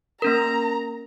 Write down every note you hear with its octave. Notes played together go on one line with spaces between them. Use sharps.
A#3 C#4 A#4 A#5